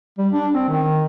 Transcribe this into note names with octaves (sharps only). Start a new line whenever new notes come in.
G3
D4
C4
D#3